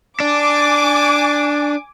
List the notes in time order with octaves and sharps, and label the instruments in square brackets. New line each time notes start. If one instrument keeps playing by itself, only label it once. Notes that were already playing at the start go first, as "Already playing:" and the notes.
[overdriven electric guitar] D4 [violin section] G#5 D6